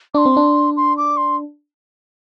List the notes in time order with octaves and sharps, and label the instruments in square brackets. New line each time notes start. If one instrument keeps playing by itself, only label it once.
[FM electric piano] D4 [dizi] C6 D6
[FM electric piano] C4
D4
[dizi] C6
D6
C6